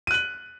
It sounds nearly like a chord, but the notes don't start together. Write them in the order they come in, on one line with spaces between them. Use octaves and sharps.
D#7 F#6 F#7